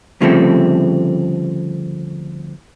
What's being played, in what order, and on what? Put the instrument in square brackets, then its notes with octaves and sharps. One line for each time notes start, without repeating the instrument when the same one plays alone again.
[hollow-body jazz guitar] D2 C#3 F3 G3 A3 C4